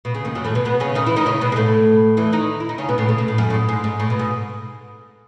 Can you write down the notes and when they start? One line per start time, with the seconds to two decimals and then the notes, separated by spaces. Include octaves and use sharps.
0.05 B2
0.15 C#3
0.25 D#2 D#3
0.35 F#2 F#3
0.45 A2 A3
0.55 B2 B3
0.65 B2 B3
0.80 C#3 C#4
0.95 D#3 D#4
1.06 E3 E4
1.16 D#3 D#4
1.26 C#3 C#4
1.41 B2 B3
1.52 G#3
1.56 A2 A3
2.17 E2 E3
2.32 D#3 D#4
2.60 E4
2.69 D#4
2.78 C#3 C#4
2.89 B2 B3
2.98 A2 A3
3.09 C#3
3.18 B2
3.28 A2
3.38 F#2
3.50 A2
3.54 G#2
3.69 G#2
3.84 G#2
4.00 A2
4.10 B2
4.19 G#2